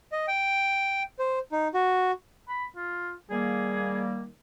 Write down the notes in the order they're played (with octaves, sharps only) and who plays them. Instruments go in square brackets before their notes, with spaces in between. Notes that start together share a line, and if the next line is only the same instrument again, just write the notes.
[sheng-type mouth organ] D#5
G5
C5
D#4
F#4
[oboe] B5
F4
[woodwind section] D#3 G3 A#3 [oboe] G#4